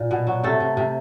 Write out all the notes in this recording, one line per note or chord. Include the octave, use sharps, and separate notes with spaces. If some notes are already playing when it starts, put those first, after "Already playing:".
Already playing: A#2
B2
F#3
C3 A3 A4
C3
C3